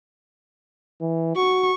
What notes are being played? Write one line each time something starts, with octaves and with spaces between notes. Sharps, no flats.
E3
F#4 C#6